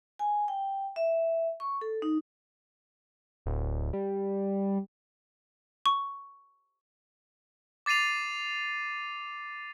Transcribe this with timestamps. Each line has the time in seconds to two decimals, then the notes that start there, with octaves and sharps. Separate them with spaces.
0.19 G#5
0.48 G5
0.96 E5
1.60 C#6
1.81 A4
2.02 D#4
3.46 D1
3.93 G3
5.86 C#6
7.86 D6 A6 C7 D#7 F7